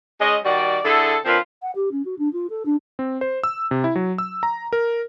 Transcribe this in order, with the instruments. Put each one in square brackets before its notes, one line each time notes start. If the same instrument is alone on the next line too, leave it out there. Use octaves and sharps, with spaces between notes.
[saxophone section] G#3 C#4 D#5
D#3 G3 F#4 D5
D3 E4 G#4 A4
F3 C4 D4 F4 A#4 B4
[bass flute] F#5
G4
C#4
F#4
D4
F4
A4
D4
[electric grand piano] C4
C5
E6
C3
E4
F#3
E6
A#5
A#4